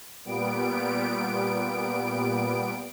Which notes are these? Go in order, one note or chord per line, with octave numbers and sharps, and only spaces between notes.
A#2 G3 B3 D7